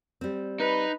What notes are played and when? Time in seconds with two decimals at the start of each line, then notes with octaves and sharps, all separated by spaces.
0.21 G3 C4
0.60 D#4 B4